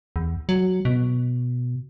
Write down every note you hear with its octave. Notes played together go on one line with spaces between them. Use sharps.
E2
F#3
B2